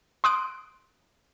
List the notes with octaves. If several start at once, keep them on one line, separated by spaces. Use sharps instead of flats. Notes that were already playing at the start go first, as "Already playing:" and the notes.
C6 D#6 F#6 D7